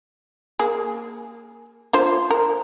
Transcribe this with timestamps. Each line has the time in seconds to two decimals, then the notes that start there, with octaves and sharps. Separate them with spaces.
0.59 A#3 G#4
1.93 D4 F4 C5
2.31 A#4